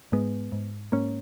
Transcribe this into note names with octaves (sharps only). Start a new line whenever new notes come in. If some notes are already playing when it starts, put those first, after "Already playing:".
G#2 G#3 B3
G#2
G#2 A#3 C#4